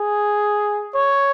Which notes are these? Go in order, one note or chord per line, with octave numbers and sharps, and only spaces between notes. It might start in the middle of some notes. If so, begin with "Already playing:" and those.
Already playing: G#4
C#5